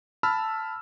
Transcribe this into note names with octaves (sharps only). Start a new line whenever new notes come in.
A5 B5 E6 F6